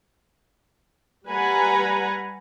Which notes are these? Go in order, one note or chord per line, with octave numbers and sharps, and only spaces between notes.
G3 B4 F#5 G#5 A#5